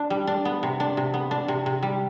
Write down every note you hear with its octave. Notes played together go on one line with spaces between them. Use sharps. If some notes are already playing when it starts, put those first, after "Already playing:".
Already playing: D4
G3
D4
B3
C3
D4
C3
B3
D4
C3
C3
G3